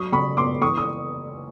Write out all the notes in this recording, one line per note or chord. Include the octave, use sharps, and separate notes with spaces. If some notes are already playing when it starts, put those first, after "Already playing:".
Already playing: F#3 C#6 D#6
C#3 B5 C#6
B3 C6 D6
E3 C#6 D#6
D#6